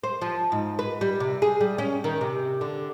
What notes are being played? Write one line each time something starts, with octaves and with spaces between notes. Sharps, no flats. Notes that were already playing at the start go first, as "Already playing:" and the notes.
C5
F3
G#2
B4
G3
C3
G#4
G3
C#4
D#3
C3
D3